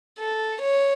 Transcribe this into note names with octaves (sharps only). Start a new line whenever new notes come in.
A4
C#5